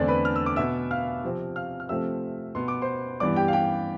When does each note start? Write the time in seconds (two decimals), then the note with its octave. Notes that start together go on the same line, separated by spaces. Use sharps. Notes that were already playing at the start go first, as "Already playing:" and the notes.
Already playing: E2 D3 A3 C4 D4 D5
0.08 B4 B5
0.25 F6
0.36 E6
0.46 D6
0.56 B2 B3 E5 E6
0.91 F5 F6
1.24 C3 F3 C4
1.56 F5 F6
1.80 F6
1.89 C3 F3 A3 C4 E5 E6
2.55 B2 B3 C6
2.68 D6
2.82 C5 C6
3.20 G2 E3 B3 D5 D6
3.36 G4 G5
3.48 F5
3.53 G4 G5